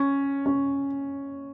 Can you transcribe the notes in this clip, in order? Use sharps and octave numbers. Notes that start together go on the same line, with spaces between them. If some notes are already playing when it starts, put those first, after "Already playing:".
Already playing: C#4
C#4